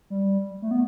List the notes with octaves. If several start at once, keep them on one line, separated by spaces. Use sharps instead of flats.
G3
A3
B3